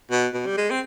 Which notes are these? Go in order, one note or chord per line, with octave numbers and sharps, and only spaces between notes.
B2
B2
G3
G#3
C4